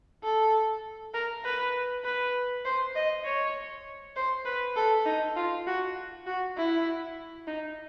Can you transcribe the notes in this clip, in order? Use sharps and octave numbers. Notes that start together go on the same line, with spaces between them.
A4
A#4
B4
B4
C5
D#5
C#5
C5
B4
A4
D#4
F4
F#4
F#4
E4
D#4